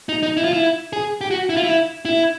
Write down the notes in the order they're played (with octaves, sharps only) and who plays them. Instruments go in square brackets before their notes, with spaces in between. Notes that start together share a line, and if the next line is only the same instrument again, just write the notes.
[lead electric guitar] D#4
D#4
E4
F4
E4
G#4
G4
F#4
E4
F4
E4
E4